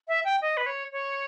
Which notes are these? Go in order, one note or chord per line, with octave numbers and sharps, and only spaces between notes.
E5
G5
D#5
B4
C#5
C#5